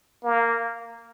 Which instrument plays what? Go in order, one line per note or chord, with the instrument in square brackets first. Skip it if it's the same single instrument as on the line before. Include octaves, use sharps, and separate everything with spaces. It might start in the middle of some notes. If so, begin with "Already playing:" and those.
[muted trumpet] A#3